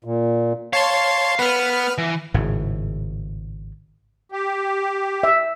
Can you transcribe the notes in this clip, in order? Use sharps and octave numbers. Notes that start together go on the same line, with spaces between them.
A#2
C#5 F5 A5 C6
B3 B4 F6
E3
G#1 A2 C#3
G4
E5